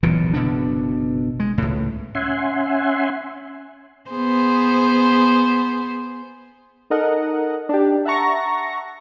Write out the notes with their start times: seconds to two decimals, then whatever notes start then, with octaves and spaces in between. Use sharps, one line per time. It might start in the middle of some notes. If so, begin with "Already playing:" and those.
0.03 D#1 B1 A#2 E3
0.34 F#1 B2 D3 D4
1.40 G#3
1.58 C#2 A2
2.15 C#4 E5 F#5 G#5 C6
4.10 B3 G#4 C5
6.90 D#4 A4 A#4 D#5 F#5
7.69 D4 G4
8.05 E5 F#5 A5 A#5 C#6 A#6